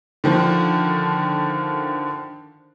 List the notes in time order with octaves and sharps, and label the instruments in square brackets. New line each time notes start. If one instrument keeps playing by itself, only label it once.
[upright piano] D3 D#3 F3